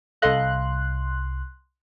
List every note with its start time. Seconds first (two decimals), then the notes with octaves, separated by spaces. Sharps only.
0.22 C2 A4 D#5 F5 C6 F#6